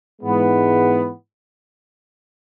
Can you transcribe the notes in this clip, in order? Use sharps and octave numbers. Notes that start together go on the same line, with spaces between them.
G#2 E3 G#3 B3